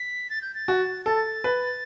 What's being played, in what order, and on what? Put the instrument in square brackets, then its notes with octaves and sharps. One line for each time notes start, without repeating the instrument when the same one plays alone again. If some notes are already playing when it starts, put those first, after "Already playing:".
Already playing: [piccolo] B6
A6
G6
A6
[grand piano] F#4
[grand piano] A4 [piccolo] A6
[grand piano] B4